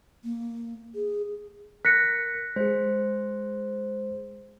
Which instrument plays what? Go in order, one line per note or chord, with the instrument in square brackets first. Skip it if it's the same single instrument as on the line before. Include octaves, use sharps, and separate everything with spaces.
[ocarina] A#3
G#4
[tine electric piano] A#4 [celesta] F#6 A#6 C#7 [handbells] B6
[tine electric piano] G#3 G#4 [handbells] C5